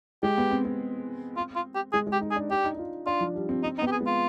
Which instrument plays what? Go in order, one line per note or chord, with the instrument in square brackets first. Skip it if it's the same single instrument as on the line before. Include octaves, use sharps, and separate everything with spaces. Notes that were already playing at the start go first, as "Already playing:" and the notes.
[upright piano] G#3 [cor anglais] G4
[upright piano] B3
C4
C4
[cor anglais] F4
F4
G4
[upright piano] G#3 [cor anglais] G#4
[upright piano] G#3
[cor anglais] G4
[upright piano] D#4
[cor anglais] G#4
[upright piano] D4
[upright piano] D4 [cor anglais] G4
[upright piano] D#4
D#4
F4
[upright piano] D4 [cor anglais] F4
[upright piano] F3
G3
C4
[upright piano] C4 [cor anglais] D#4
[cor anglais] D#4
[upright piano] B3 [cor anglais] G4
[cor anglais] G#4
[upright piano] G#3
[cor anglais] F4